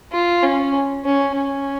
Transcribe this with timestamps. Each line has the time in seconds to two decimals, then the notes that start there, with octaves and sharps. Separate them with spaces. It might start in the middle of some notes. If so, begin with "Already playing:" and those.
0.13 F4
0.43 C#4
1.05 C#4
1.36 C#4